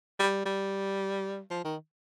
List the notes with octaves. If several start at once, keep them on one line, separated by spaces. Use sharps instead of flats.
G3
G3
F3
D#3